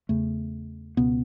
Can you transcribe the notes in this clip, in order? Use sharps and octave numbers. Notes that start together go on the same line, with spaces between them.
E2 C#3 A3
C#2 B2 B3